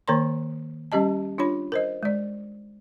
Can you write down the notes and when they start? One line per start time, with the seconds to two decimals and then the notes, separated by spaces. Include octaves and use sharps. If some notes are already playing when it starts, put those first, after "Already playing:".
0.08 D#3 A#3 A#4 C#5 A#5 C6
0.92 G3 C#4 G4 D#5 A5
1.38 D4 F4 C#5 B5
1.72 A#4 C5 D#5
2.03 G#3 D5